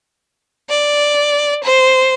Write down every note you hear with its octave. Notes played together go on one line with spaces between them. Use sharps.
D5
C5